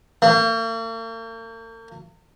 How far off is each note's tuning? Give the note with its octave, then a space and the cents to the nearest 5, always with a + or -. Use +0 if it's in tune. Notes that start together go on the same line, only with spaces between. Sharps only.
A#3 -45